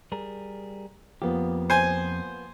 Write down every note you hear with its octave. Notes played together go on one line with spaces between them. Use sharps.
G3 G#4 A#4
F2 F3 A#3 B3 G4
C5 G#5